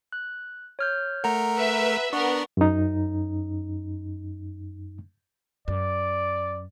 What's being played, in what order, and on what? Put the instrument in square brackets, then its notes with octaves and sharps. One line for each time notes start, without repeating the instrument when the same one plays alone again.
[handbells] F#6
C#5 F6 G6
[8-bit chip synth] A3 A#4 [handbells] F#5 A#5
[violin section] B4 E5
[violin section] B3 A#4 [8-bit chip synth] D4 [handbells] C#6
[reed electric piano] F#2 D#4
[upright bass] F#2 [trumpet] D5